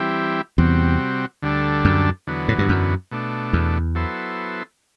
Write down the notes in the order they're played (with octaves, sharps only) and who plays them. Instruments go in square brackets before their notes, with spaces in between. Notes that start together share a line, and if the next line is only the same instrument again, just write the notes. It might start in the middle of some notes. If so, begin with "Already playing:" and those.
Already playing: [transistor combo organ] E3 G3 C4 E4 G4
[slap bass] E2 [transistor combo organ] C3 G3 C4 F#4
[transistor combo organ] D2 D3 G3 D4 A4
[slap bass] F#2
[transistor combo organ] E2 D3 F#3 B3
[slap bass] A2
G2
F#2
[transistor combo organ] B2 A3 D4
[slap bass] E2
[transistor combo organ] F#3 B3 E4 A4 C5